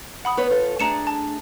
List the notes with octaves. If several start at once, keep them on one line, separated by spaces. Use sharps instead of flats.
F#5 B5 D#6
B3 B4 C#5
F4 A4
A3 D4 G#4 A#5 C#7 E7
A5